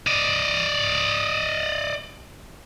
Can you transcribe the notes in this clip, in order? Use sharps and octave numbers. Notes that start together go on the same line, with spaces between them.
D5 D#5